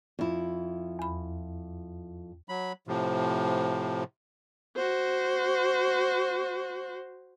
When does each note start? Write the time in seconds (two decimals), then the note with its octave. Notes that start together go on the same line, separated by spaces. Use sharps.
0.19 F2 E4
0.99 E2 B5
2.49 F#3 B5
2.88 A2 C3 F3
4.76 F#4 C5